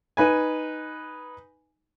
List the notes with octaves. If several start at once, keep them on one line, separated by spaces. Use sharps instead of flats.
D#4 B4 G#5